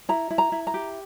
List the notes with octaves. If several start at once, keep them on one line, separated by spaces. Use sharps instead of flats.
E4 A#5
E4
A#5
E4
A#5
G4